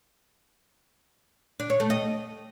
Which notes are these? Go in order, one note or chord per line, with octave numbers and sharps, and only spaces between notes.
D4
C#5
A3
D#5